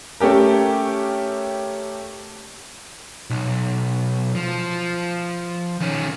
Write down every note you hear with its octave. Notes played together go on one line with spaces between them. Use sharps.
A3 C#4 G4 A#4
B1
F3
D#3 C#4